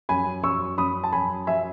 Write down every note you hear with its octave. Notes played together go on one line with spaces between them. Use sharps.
F#2 G#5 B5
F#2 C#6 E6
F#2 B5 D#6
A5
F#2 G#5 B5
F#2 E5 G#5